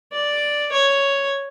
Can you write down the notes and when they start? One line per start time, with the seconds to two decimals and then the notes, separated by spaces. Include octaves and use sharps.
0.12 D5
0.72 C#5